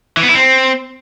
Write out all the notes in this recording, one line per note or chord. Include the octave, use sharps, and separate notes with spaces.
E3
B3
E4
C4